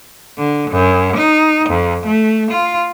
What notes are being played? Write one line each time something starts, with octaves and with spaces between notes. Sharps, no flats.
D3
F#2
D#4
F2
A3
F4